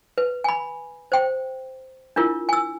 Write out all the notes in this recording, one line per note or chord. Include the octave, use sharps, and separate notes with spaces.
B4
G#5 B5
C5 G5
D4 E4 F4 A#4
G#5 E6